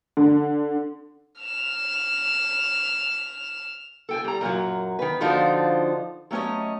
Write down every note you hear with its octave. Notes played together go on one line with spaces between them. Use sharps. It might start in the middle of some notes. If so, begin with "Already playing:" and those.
D3
F6 E7
A4 G5 G#5
G3 A#5
F#2 A#2 D#3 F#3
D#3 B4
D3 F3 D#4 F4 F#4 C5
F#3 A3 C#4 C#5 D#5